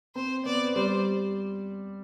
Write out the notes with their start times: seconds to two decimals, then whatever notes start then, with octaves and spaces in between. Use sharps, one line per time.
0.15 C4 C5
0.46 B3 D5
0.76 G3 C5